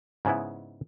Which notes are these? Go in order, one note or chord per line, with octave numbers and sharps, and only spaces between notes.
G#2 C#3 G#3 B3 E4